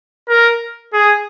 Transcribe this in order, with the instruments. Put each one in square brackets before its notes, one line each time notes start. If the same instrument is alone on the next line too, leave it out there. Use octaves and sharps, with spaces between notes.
[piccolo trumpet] A#4
G#4